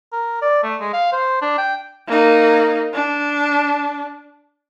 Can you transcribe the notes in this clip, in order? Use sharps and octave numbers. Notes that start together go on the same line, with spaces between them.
A#4
D5
A3
G#3
F5
C5
D4
G5
A#3 D#4
D4